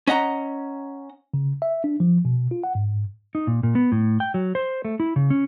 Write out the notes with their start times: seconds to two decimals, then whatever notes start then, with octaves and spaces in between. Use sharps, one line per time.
0.07 C#4 D#5 F#5 A#5
1.34 C#3
1.62 E5
1.84 D4
2.00 F3
2.25 B2
2.51 F4
2.64 F#5
2.75 G#2
3.35 D#4
3.47 A#2
3.63 A#2
3.75 B3
3.92 A2
4.20 G5
4.34 F#3
4.55 C5
4.85 A3
5.00 E4
5.16 C#3
5.30 C#4